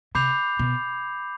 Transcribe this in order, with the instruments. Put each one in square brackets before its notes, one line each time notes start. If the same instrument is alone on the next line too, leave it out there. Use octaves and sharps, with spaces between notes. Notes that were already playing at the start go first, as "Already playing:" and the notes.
[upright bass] C3 [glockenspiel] B5 D6 G6 C7 F7
[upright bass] B2